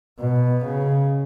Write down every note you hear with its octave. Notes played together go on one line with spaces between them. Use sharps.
B2
C#3